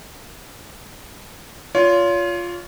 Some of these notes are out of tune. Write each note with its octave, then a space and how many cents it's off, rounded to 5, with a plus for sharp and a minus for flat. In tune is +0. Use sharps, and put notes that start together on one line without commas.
F4 +0 C#5 +35